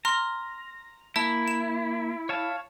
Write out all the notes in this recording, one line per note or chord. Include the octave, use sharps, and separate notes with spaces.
A#5 C6 F6
A#3 E4 A5
E7
C#5 F5 A5